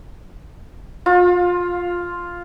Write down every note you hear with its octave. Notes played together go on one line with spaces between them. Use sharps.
F4